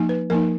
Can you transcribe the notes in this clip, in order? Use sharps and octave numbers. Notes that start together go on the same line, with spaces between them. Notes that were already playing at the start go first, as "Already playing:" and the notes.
Already playing: F3 A#3 D#4
B4
F3 A#3 D#4 A#4